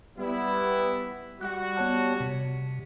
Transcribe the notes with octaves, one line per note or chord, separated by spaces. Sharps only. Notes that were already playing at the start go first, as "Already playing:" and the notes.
G3 B3 E4
G3 F#4 F#5 F#6
B3 C#5 A5
C3